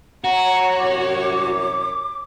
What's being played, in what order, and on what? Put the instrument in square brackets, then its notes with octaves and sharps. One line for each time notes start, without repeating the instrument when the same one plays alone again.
[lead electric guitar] F#4 [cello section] C#5 [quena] F#5 [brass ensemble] A#5
[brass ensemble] C2 F#2 [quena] D6